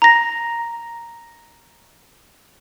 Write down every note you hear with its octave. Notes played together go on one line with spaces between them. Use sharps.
A#5 A#6